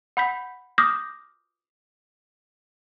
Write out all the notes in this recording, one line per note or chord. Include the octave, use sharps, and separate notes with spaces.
F#5 B5 G6 B6
D6 D#6 F6 G6 A#6